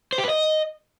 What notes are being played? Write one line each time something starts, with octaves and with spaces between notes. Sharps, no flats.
C5
G4
B4
D#5